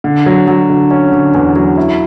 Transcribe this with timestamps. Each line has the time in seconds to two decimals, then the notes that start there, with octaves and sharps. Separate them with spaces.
0.04 D3
0.26 F#3
0.48 F#3
0.70 D3
0.91 C#4
1.12 D3
1.34 E2
1.56 F#3
1.78 E4